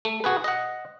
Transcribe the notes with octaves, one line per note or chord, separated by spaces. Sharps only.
A3
F#4 G#4 B4
D#5 F#5